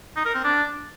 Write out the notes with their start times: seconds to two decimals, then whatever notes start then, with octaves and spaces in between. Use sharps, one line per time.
0.16 D#4
0.26 A#4
0.35 C4
0.44 D4